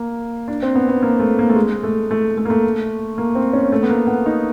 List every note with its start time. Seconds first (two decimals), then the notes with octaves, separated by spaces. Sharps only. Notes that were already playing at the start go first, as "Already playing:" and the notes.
Already playing: A#3
0.48 D4
0.62 C4
0.75 B3
0.89 B3
1.02 A#3
1.20 A3
1.39 A#3
1.49 A3
1.56 G#3
1.83 A3
2.11 A3
2.38 A3
2.45 A#3
2.50 A3
3.18 A#3
3.35 C4
3.53 C#4
3.72 A3
3.83 B3
3.89 A#3
4.07 B3
4.26 D#4